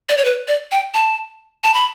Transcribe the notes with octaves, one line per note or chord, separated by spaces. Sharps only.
D5
C#5
B4
D5
G5
A5
A5
B5